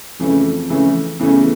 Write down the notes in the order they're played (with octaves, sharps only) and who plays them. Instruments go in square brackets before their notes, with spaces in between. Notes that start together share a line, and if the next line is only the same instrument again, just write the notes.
[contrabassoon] F2 [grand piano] C#3 E3 A3 C#4
[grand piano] C#3 E3 A3 C#4
[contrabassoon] E2 [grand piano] C#3 E3 A3 C#4